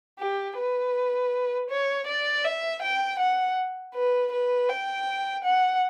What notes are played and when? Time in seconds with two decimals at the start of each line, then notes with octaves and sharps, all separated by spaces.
0.19 G4
0.57 B4
1.70 C#5
2.07 D5
2.44 E5
2.82 G5
3.19 F#5
3.94 B4
4.32 B4
4.69 G5
5.44 F#5